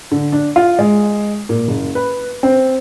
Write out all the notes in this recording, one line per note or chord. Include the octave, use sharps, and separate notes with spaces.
D3
D4
F4
G#3
A#2
F#1
B4
C4